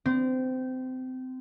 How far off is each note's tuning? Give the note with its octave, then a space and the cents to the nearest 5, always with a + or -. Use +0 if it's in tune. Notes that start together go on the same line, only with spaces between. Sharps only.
C4 -25